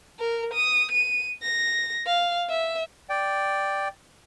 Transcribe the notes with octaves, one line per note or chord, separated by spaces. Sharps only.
A#4
D#6
D#7
A#6
F5
E5
D5 G5